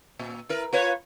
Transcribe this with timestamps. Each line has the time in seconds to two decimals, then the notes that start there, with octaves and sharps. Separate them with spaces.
0.19 A#2
0.49 E4 A#4 B4
0.73 F4 B4 C#5